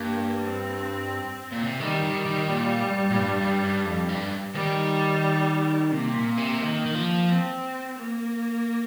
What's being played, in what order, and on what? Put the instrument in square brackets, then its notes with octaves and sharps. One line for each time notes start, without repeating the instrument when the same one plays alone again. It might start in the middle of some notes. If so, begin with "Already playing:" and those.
Already playing: [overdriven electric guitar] G2 [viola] A#3
[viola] C4
[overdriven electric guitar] A#2
C3
[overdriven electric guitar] D#3 [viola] G3
[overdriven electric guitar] D#3
D#3
A#2
G2
A#2
G2
G2
G2
F2
G2
[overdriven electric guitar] D#3 [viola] G3
[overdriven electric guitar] C3 [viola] A#3
[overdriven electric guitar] A#2
C3
D#3
D#3
F3
[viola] C4
A#3